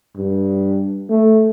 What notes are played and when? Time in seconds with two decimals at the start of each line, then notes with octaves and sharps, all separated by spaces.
0.17 G2
1.09 A3